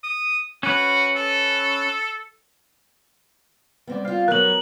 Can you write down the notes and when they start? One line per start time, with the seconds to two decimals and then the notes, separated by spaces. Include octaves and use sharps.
0.04 D#6
0.63 C#4 F#4 B4
1.16 A4
3.87 G3 B3 C4 D5
4.05 C4 F4 F5
4.28 F#3 B3 A#4 F#6 F#7